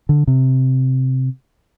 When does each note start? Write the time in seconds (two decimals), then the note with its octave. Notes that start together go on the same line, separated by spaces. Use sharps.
0.09 D3
0.27 C3